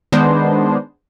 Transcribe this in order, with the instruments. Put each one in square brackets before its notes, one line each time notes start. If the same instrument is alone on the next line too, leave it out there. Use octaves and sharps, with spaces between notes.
[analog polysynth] D#3 G#3 B3 D4 C5